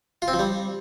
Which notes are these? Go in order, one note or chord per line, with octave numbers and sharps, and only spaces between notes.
F4
C4
F3
G3